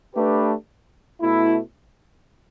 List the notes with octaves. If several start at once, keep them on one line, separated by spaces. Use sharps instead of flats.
A3 D4 G4 B4
B2 A3 E4